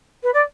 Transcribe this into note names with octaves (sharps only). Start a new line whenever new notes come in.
B4
D5